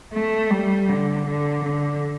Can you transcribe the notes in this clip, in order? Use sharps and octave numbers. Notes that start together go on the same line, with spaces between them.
A3
G3
D3
D3
D3